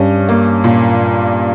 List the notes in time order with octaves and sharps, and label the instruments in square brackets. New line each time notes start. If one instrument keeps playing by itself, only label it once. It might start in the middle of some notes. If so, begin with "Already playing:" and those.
Already playing: [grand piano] G2 [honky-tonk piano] C#4
[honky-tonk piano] A#3
A#2